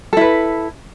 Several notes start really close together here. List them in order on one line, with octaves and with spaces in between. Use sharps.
A4 E4 B4